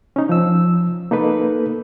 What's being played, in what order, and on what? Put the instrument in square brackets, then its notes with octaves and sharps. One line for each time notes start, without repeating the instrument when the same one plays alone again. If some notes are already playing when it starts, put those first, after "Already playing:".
[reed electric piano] C#4 D#4
F3 E6
A#3 D#4 A4 B4